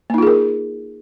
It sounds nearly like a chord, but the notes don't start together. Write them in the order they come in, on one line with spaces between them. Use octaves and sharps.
A#3 D#4 F4 G#4 A#4